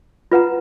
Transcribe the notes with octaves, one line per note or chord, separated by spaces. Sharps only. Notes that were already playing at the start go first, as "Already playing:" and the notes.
F4 B4 F#5 A#5